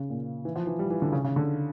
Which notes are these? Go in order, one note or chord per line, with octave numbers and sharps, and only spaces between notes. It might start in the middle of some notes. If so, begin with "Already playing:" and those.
Already playing: C#3
A#2
E3
F3
E3
G3
E3
D3
C#3
C#3
D3